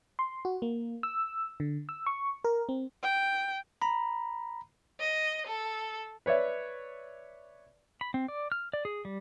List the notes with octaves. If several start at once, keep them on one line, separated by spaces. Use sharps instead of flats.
C6
F#4
A#3
E6
D3
E6
C#6
A#4
C4
G5
A#5 B5
D#5
A4
B4 C#5 D5 E5
B5
C4
D5
F6
D5
G#4
G3